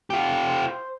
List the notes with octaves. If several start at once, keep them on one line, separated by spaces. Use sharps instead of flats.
F4 G4
C5